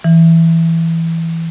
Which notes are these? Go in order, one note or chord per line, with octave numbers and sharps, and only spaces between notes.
E3